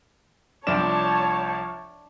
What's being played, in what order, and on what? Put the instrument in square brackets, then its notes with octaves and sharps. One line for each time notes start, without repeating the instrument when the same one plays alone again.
[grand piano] C2 F3 E7 [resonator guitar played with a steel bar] D4 [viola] C#5 A5 [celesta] D6